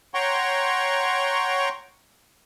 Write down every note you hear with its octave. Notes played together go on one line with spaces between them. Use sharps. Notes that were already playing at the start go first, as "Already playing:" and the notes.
C#5 F#5 G5 A#5 C6 C#6